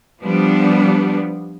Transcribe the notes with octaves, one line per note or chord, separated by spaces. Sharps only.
F3 G3 B3 D4